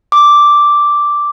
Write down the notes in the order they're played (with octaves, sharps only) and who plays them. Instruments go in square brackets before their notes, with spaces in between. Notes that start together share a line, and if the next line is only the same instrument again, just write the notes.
[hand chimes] D6